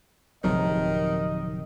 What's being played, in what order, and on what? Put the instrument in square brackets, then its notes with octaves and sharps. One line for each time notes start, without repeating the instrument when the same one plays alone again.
[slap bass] D1 F3 F#3 [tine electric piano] C3 D#4 [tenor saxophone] D#3 [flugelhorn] D#5